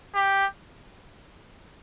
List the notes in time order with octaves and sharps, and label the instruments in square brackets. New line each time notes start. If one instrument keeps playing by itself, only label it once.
[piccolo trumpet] G4